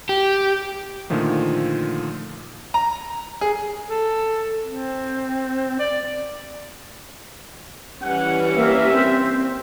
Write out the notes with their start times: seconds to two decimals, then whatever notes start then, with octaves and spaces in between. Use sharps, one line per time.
0.09 G4
1.10 A#2 D3 D#3 F3 A3
2.74 A#5
3.41 G#4
3.89 A4
4.65 C4
5.80 D5
8.02 E3 G3 C#4 F#5
8.56 A#3 E5
8.93 C4